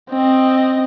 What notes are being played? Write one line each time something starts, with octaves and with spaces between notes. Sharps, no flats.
C4 D#5